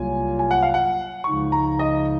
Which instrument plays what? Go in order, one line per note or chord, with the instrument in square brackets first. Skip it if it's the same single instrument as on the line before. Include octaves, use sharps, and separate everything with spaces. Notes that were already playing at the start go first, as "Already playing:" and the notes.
Already playing: [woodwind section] C2 C3 F#3 A#3 F4 [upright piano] G#5
[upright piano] G#5
F#5
F5
F#5
[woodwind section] C#2 C#3 F3 G#3 D#4 [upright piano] C#6
[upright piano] A#5
D#5